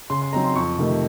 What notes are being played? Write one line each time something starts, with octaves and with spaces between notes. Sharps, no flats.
C#3 C6
C6
F#3 C4 D#4 A#5
C6
F2 C#6
C3 D#3 A3 D#4